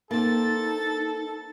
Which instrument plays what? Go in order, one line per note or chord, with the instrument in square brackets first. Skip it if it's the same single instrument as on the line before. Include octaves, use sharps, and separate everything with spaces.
[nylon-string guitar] A#3 C4 [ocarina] D#4 [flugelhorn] A4 [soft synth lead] A6